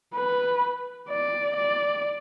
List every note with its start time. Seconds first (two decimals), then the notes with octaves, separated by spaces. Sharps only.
0.14 B4
1.09 D5
1.56 D5